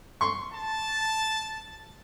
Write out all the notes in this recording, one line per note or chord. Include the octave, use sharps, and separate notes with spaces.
C6 C#6
A5